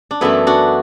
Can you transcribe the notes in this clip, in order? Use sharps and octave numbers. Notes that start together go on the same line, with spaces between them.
D4
F#2 E3 A3 B3 E4
D4 F#4